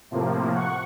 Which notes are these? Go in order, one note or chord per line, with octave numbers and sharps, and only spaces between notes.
A2 C3 F3 A#3
F#5 C#6